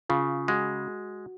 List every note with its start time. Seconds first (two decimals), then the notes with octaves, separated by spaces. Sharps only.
0.10 C#3 F4
0.48 G#3 F#4